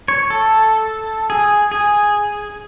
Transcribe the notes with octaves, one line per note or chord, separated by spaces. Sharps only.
C#5
A4
G#4
G#4